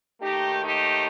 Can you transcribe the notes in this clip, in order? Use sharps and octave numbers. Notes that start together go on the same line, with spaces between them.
D#2 D#3 A3 D#4 G4
D#4 G4